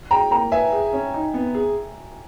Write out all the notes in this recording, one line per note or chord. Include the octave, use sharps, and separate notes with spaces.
G#4 G5 A#5
A#3 G5 A#5
B4 E5 G#5
G#4
C#4
D#4
B3
G#4